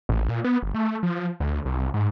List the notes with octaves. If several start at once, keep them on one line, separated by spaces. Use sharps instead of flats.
A1
A#2
B3
G1
A3
F3
D2
C2
G#2